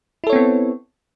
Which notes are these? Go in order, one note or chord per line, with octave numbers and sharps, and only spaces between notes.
B3 C4 E4 A4 C#5